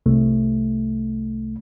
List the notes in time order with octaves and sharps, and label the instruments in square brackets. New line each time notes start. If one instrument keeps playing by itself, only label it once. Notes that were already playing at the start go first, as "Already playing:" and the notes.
[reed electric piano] C2 A3